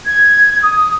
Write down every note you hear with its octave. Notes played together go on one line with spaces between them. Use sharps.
G#6
D#6